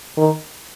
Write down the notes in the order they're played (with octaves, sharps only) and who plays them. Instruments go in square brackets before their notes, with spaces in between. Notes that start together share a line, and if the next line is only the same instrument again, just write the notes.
[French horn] D#3